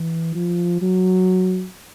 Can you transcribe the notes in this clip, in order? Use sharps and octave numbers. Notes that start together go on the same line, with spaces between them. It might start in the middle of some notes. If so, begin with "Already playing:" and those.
Already playing: E3
F3
F#3